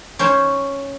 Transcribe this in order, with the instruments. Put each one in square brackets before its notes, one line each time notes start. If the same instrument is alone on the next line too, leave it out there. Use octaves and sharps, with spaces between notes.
[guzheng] C#4 C5 C#5